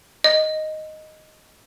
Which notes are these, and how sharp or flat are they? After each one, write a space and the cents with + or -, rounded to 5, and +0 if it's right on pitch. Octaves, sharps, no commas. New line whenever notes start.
D#5 +0